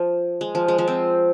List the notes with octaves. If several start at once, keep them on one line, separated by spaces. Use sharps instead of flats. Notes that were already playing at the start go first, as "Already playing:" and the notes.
Already playing: F3
G#3
F3
G#3
F3
C4